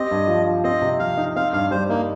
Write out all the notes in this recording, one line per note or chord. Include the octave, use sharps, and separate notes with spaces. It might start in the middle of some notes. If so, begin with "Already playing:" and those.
Already playing: C4 G4 D#5
G2
F3
F4
C4 D#5
C3
F3 F5
D#4
C4 F5
G2 F5
G3 C5
A#3 D#4